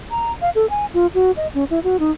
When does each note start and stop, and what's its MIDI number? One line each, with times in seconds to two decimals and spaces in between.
0.11 0.32 82
0.42 0.50 77
0.55 0.68 69
0.70 0.86 80
0.94 1.07 65
1.14 1.31 66
1.37 1.47 75
1.54 1.64 61
1.70 1.80 64
1.84 1.99 66
2.00 2.11 63